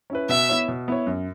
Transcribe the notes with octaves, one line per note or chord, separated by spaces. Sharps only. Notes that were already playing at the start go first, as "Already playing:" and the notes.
C#4 E4 B4
B2 E5
B3 E4 C#5
B2
B3 E4 C#5
F#2